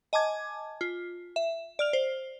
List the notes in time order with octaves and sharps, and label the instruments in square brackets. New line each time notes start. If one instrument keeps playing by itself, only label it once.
[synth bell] D#5 G#5 A5 D6 G#6
F4
E5
D5 F6 F7
C5